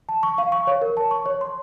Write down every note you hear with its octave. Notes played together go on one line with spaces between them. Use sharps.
A5
C#6
F5
C#6
C#5
A#4
A5
C#6
C#5
C6